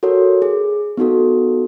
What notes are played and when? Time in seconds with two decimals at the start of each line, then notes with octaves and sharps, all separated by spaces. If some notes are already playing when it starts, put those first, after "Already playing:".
0.03 F#4 A4 A#4 C#5
0.42 G#4
0.97 B3 D#4 F#4 A4